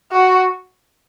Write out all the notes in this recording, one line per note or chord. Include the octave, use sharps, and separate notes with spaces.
F#4